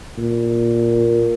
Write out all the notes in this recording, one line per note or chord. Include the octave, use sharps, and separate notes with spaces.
A#2